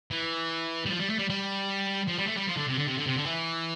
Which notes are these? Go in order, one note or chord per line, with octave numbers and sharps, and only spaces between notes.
E3
G3
F3
G3
A3
G3
G3
F3
G3
A3
G3
F3
D3
C3
D3
C3
D3
C3
D3
E3